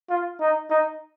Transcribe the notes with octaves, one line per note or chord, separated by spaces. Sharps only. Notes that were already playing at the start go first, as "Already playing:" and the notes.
F4
D#4
D#4